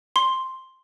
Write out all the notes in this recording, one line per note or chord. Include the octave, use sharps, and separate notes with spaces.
C6